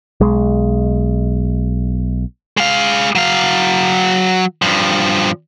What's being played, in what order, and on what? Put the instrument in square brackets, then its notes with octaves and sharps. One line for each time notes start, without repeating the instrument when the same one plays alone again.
[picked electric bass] B1 G#3
[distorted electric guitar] G#3 F5
F#3 F5
G2 F3